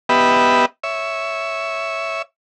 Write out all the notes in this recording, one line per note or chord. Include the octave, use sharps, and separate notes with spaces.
B3 G4 B4 D#5 E5
C#5 E5